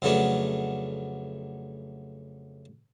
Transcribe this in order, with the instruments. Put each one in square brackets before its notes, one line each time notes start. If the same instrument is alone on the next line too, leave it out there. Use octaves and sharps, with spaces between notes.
[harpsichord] F2 C#3 F#3 A3 B3 D4